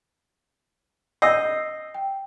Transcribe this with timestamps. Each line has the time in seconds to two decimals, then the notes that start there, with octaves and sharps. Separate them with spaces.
1.22 D#5 E6 G6 C7
1.94 G5